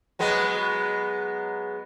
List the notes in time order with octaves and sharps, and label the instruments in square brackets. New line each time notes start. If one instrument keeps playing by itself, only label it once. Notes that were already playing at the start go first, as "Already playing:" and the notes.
[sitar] F#3 G#3 B3